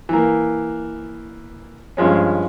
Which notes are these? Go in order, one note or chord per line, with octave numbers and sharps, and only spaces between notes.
E3 A#3
G2 F3 G#3 C#4